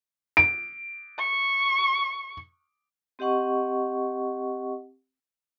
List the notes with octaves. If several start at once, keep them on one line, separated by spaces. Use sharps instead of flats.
D7
C#6
C4 G4 D#5 F#5 C#6